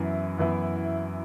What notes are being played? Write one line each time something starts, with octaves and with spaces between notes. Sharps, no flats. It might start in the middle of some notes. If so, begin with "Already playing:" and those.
Already playing: F#2 E3 B3 E4
F#2 E3 B3 E4